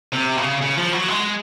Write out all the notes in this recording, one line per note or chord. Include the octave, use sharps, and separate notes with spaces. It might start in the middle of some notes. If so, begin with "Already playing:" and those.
C3
C#3
C#3
F3
F#3
G#3